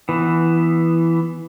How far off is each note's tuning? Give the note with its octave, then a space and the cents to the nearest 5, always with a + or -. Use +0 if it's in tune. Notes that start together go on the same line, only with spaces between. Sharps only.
E3 +5 B3 +0